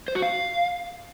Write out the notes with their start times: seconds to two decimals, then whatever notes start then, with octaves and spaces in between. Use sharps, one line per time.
0.08 C5
0.15 F#4
0.22 F5